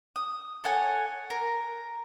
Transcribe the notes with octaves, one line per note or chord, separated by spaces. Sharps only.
D#6
A4 C#5 F#5 G#5
A#4